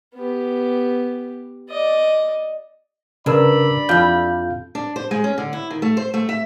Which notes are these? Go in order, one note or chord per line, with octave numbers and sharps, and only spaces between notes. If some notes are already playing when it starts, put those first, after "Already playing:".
B3 G4
D5 D#5
G2 C#3 A#4 D5 B5 E6
F2 E4 F4 F5 G6
D4
C5
G#3
C#4
D3
E4
D#3
A3
C5
A3
E5